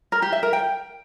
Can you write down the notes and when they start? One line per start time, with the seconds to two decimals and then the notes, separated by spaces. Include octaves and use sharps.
0.12 A#4
0.22 G4
0.33 E5
0.43 A#4
0.53 G5